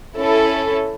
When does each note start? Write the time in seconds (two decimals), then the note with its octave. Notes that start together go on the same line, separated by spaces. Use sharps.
0.18 C#4 E4 A4